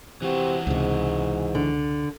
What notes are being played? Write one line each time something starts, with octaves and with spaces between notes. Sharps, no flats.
C3 E3 F#4
C#2 G#2 C3
D3